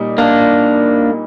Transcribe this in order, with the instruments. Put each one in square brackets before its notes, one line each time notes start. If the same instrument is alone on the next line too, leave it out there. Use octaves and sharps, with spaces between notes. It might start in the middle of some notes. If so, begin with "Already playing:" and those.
Already playing: [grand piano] A#2 G3 D#4
[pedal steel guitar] A#3 D4